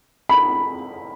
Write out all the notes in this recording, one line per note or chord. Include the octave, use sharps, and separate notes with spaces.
B5